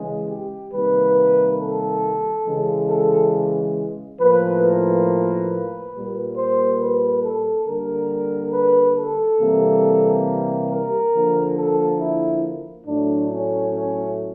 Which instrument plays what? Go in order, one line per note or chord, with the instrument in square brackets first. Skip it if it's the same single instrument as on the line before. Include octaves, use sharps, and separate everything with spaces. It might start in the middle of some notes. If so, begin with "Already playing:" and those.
Already playing: [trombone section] C#3 E3 G#3 G#4
G4
C3 D#3 G3 A#3 B4
A4
C#3 E3 G#3
A4
A2 F3 A#3 B4
B4
A#2 G3 A#3
C5
B4
A4
D3 G3 A#3 A#4
B4
A4
C3 E3 G3 A#3
A#4
D3 F3 A#3
A4
E4
A2 F#3 A3 D4
C#4
C#4